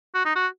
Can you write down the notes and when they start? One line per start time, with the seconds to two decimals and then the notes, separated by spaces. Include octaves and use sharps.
0.15 F#4
0.25 D#4
0.36 F#4